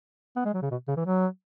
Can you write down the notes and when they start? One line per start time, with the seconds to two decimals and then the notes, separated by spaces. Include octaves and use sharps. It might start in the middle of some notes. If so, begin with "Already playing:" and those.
0.36 B3
0.45 G#3
0.54 F#3
0.62 C#3
0.71 B2
0.88 C#3
0.97 E3
1.06 F#3